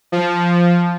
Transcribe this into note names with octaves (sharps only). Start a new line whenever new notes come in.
F3